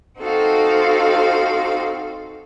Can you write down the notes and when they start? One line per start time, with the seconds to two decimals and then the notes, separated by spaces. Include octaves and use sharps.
0.20 C4 D#4 F#4 A4 C5 F5